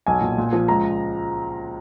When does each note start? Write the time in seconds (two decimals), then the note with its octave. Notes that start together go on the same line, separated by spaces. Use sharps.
0.07 B1 G#5
0.22 A#2
0.38 A#2
0.53 F3
0.68 C#2 A#5